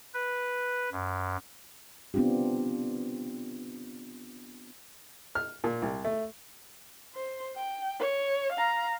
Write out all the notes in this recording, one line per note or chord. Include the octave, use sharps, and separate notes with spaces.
B4
F#2
B3 C4 D4 F4 G4
F6
A#2
C2
A3
C5
G5
C#5
F5 A#5